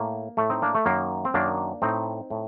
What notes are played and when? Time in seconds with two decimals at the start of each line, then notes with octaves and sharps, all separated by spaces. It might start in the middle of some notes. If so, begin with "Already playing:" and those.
Already playing: A2 A#3
0.37 A2 A3
0.50 C4 D#4
0.62 A#3 D4
0.75 A3
0.85 F#2 D#3 A#3
1.25 C4
1.34 F#2 D#3 A#3 D4
1.82 A2 C4 D#4
2.30 A2